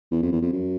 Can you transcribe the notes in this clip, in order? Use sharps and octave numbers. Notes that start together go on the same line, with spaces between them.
E2
F2
E2
F2
F#2